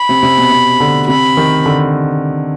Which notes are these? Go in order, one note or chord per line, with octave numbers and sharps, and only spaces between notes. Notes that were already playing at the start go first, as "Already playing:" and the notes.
Already playing: B5
C3
C3
B2
C3
D3
C3 B5
D#3
D3